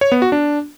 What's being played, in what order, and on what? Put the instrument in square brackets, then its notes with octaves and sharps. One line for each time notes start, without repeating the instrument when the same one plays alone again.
[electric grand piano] C#5
B3
F#4
D4